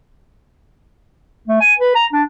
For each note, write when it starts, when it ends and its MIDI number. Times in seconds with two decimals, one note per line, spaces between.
1.48 1.60 57
1.61 1.74 80
1.79 1.94 71
1.95 2.06 82
2.13 2.23 62